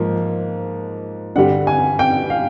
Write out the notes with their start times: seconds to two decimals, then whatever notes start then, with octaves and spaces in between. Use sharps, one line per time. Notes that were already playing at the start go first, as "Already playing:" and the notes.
Already playing: G#2 F3 A#3
1.36 G2 D3 G3 F#5
1.67 G#5
1.99 G5
2.30 F5